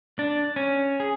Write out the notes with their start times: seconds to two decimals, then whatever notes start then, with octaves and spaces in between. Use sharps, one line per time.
0.19 D4
0.56 C#4
1.00 G#4